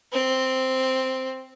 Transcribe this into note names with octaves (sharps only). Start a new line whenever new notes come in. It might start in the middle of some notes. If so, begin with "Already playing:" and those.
C4